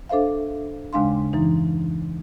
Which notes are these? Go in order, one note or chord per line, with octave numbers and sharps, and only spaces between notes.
D4 A4 C5 E5 F5
D#2 C#3 G#3 D4 F5 C6
F#2 E3 D#4